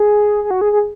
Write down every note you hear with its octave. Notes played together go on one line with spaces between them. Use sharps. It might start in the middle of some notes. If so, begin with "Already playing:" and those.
Already playing: G#4
G#4
F#4
G#4
G#4